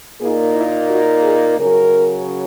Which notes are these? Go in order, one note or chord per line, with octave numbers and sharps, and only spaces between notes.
A#2 A#3 D#4 G#4
E4
F#4
G#4
C#3 F#3 C#4 A#4